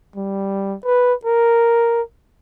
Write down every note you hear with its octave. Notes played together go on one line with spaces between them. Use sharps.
G3
B4
A#4